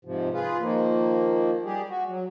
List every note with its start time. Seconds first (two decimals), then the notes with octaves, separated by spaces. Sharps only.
0.05 G#2 C3 F3
0.34 F4 G#4 B4 F5
0.60 D#3 F3 A#3
1.65 G3 G4 G#4
1.89 F#4
2.09 F#3